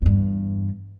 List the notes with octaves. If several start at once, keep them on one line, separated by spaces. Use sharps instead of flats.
E2 G2